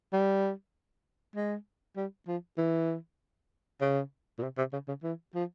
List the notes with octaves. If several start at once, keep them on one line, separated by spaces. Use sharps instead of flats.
G3
G#3
G3
F3
E3
C#3
A#2
C3
C3
C#3
C#3
E3
F3